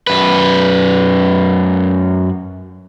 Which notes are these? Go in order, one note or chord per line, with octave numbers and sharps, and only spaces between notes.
F#2 B4